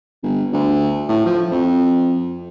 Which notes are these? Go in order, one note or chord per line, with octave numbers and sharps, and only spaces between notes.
G1
D2
A2
F3
F2